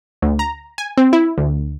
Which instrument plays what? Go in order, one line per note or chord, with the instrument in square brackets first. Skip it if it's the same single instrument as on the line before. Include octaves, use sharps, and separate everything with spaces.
[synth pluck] D2
A#5
G#5
C4
E4
D2